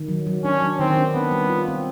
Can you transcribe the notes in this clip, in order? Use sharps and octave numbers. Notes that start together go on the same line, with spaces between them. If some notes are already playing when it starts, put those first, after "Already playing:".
Already playing: D#3
F#3
F#3
C#4 D4
F#3
D#3 C4
D4
B3 C4
G3
F4
C4